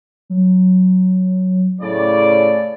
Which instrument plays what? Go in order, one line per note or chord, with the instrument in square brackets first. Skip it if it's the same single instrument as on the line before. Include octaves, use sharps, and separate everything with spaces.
[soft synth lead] F#3
[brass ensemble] A2 C#3 D5 [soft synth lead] C#5